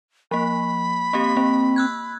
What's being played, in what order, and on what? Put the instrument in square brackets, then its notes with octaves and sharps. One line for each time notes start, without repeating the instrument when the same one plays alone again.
[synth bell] F3 A#3 [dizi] B5
[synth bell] A#3 C4 G4
[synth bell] A#3 [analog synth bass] C4
[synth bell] E6 F#6 G#6